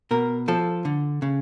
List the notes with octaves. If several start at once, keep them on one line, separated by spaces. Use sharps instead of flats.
B2 A#4
F3 A4
D3
C#3